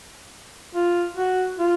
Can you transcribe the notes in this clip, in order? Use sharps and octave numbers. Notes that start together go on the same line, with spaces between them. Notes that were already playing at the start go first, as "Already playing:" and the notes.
F4
F#4
F4